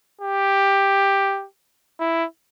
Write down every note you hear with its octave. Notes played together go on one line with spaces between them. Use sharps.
G4
E4